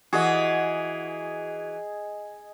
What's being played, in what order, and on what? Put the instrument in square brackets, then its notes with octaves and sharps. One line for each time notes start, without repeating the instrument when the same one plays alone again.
[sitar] E3 F#4 [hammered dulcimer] G#4 D#5